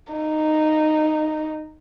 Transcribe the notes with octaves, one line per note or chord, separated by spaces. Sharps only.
D#4